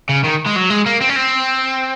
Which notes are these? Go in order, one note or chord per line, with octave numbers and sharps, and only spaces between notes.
C#3
D#3
G#3
F#3
G#3
A#3
C4
C#4
C4